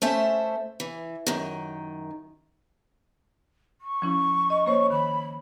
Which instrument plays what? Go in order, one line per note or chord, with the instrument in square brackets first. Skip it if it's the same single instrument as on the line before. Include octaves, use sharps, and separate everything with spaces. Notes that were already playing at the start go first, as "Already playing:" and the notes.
[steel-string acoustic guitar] A3 C#4 C5 E5
E3
F#2 D#3
[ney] C#6
[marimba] F3 C#4 E4
D#5
A#3 C5 C#5
[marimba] D#3 [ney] B5